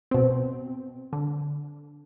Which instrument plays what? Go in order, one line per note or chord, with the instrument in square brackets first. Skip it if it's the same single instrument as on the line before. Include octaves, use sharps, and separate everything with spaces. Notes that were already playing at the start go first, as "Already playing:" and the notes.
[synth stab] B2 C4
D3